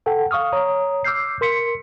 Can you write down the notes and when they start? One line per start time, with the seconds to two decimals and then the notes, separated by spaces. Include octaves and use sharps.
0.06 A4 F#5 G5 A5
0.31 F5 C#6 D#6 F6
0.52 C#5 A#5 D#6
1.04 D6 E6 F6 G6 C7
1.41 A#4 C6 B6 C#7